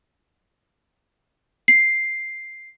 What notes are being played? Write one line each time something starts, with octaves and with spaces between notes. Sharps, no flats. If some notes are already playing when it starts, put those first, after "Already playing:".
C7